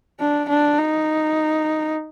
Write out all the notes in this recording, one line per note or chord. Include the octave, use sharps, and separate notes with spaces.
D4
D4
D#4